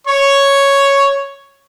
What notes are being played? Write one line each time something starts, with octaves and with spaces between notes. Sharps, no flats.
C#5 C#6